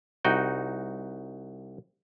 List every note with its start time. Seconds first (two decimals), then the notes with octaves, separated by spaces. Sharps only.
0.25 C2 D#4 F#4 G5